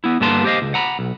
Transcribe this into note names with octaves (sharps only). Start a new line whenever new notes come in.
B3 E4
G2 D3 A#3 B3 A5 C6
G4 C5 D#5 F5
C#2
F#5 A#5 B5
B1